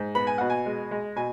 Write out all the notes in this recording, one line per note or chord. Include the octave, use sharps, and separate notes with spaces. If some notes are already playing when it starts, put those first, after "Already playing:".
Already playing: G#2
B3 B5
G#5
B2 F#5
G#5
G#3
G#3
B2 G#5